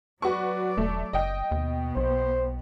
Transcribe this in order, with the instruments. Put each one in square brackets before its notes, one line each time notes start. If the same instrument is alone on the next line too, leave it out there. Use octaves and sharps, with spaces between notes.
[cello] F#3 D5 [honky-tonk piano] F#4 B4 C#6
[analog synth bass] E1 [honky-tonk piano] A3
[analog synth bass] F#1 [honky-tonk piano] D#5 G5
[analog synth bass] D#2 [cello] B2 B3
[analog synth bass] B1 [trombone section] C5